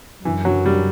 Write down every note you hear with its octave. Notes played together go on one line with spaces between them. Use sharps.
F#2 E3
F#3
G3